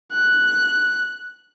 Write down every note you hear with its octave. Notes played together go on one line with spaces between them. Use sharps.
F#6